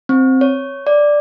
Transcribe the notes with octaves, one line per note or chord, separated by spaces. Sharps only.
C4
C#5
D5